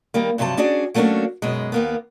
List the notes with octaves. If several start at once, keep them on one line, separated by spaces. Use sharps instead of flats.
D#3 G3 A#3
G2 C3 F3 F#3 A5
C#4 D4 F#4 G#4 D5
F#3 A3 A#3 C#4 D4 F#4
F#2 B2 G#3
D#2 A#3 B3